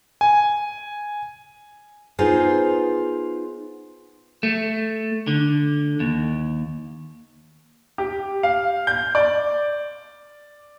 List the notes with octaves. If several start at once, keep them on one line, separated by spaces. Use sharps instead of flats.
G#5
B3 D#4 F4 G#4 B4 C5
A3
D3
D#2
G4
F5
G6
D5